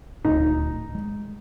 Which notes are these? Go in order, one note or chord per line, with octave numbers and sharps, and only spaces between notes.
D#1 D2 A2 D#4
G#3